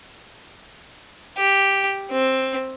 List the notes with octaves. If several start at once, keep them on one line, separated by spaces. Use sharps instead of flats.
G4
C4